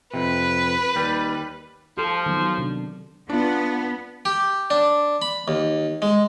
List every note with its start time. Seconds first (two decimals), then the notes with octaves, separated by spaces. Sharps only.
0.14 F2 C3 B4
0.96 D#2 G3
1.97 F3 G4 A4
2.26 D#3 F#3 B3
2.58 C3 D4
3.30 B3 D4 F4
4.25 G4
4.70 D4
5.22 B5
5.48 D#2
6.02 G#3